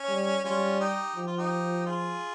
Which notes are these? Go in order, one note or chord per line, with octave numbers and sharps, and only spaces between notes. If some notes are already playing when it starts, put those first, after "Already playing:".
Already playing: C#4
G3
G3 C#4 F4
D#4 G4
F3 G4
F4
D#4 G4
F4 G#4